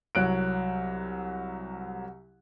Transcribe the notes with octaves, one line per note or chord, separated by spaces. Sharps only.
C2 F#3 F#6 D7